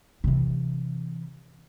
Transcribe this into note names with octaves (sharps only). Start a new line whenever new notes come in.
C3 E3